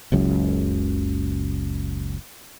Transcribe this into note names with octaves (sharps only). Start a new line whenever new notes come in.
F#1 C#2 F#2